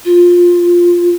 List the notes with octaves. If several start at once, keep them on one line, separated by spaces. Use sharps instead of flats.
F4